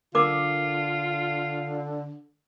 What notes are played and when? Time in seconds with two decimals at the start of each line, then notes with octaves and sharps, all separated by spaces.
0.15 D3 F4 A#4 D6